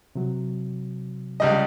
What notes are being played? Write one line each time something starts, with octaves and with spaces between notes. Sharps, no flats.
C3 F#3
C#2 G3 D#5